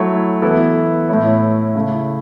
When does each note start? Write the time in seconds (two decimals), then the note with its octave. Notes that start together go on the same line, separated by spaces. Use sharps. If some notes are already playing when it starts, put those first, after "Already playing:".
Already playing: F#3 A3 E4 C#5
0.42 E3 B3 E4 A4
1.09 A2 A3 E4 C#5
1.75 C#3 A3 E4